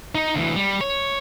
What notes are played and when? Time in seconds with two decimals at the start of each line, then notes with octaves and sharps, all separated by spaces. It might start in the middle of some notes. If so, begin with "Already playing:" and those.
0.15 D#4
0.34 D2 E3
0.56 G3
0.81 C#5